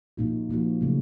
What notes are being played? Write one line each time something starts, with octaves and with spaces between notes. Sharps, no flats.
A#2 F3 A#3 D#4 F#4
A#2 F3 A#3 D#4 F#4
C#3 F#3 A3